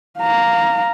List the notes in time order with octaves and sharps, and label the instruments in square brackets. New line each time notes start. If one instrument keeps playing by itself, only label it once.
[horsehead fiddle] F5 A#5